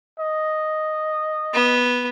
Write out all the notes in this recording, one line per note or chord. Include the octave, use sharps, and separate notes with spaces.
D#5
B3